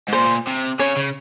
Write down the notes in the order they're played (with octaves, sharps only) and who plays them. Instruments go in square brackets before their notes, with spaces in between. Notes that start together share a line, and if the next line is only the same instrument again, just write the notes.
[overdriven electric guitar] G#2
[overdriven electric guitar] A#2 [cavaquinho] C5
[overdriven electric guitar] C3
[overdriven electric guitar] C#3 [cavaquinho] C#5
[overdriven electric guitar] C#3